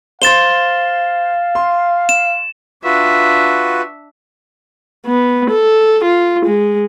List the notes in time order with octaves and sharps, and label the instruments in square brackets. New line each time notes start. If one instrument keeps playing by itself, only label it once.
[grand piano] C5 C6 [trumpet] F5 [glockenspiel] A6 E7 G7
[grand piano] C6
[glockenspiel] E7
[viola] D4 E5 [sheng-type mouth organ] F4 F#4 B4
[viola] B3
A4
F4
G#3